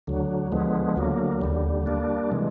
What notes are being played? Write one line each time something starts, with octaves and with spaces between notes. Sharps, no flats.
D2 D3 F#3
D3 F3 G#3 B3
D2 D3 F#3 A#3
D#2 D3 G3
G3 A#3 D4
C3 E3 G#3